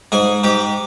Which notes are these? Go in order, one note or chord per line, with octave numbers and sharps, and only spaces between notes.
G#2 G#4
G#2 G4